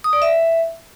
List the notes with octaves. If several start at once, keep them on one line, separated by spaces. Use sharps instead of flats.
D#6
D5
E5